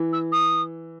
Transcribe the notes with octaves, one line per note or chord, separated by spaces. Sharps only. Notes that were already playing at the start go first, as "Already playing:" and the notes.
Already playing: E3
E6
D#6